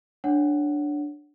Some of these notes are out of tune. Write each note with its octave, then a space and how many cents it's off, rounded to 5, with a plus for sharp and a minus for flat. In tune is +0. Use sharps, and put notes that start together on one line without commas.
D4 +0 C#5 +0 F#5 +5